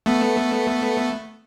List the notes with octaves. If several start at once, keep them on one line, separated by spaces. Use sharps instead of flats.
A3 B3